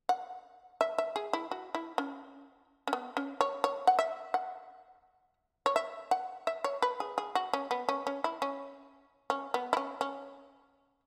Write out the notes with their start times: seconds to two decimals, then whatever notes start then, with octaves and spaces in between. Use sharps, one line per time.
0.09 F#5
0.81 E5
0.98 E5
1.16 G#4
1.33 E4
1.51 F#4
1.75 E4
1.98 C#4
2.88 C#4
2.93 B3
3.17 C#4
3.41 C#5
3.64 C#5
3.87 F#5
3.99 E5
4.34 F#5
5.66 C#5
5.76 E5
6.11 F#5
6.47 E5
6.64 C#5
6.82 B4
7.00 G#4
7.18 G#4
7.35 F#4
7.53 C#4
7.71 B3
7.89 C#4
8.07 C#4
8.24 E4
8.42 C#4
9.30 C#4
9.54 B3
9.73 E4
9.77 C#4
10.01 C#4